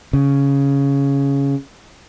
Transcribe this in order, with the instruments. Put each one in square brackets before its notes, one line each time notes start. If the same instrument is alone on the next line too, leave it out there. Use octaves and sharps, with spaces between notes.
[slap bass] C#3